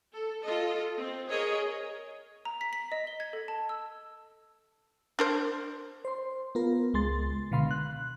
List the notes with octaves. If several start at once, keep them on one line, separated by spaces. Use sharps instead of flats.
A4
F4 A4 D#5
C4
G#4 A#4 C#5 D#5
A#5
B6
B6
D#5
G7
G#6
A4
A5
E6
D4 A#4 C5
C5 C6
B3 F4 A#4
C#2 G#3 C6 A6
B2 D3 F5 B5 C6
F#6